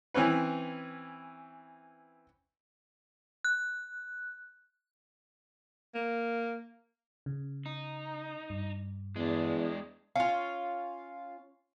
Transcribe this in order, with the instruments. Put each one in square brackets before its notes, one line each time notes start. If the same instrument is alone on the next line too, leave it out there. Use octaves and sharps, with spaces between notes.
[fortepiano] E3 C4 C#4 B4
[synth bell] F#6
[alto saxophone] A#3
[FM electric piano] C#3
[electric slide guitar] D#4
[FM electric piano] G2
[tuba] E2 [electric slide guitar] G#3 D4
[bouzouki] C#4 F4 [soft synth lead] F5